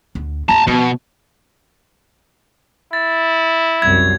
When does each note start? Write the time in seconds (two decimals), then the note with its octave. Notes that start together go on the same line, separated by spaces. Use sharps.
0.15 D2
0.49 D#2 F4 A5 A#5
0.67 B2 F3 B3
2.93 E4 A6
3.82 C2 F#2 G#6